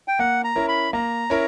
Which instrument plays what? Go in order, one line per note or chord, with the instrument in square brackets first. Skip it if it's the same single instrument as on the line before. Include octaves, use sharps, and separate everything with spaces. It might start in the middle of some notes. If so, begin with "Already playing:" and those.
[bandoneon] G5
[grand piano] A#3 [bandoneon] F#5
[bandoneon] A#5
[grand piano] C#4 E4 A#4
[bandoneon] B5
[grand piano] A#3 [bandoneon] A#5
[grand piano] C#4 E4 A#4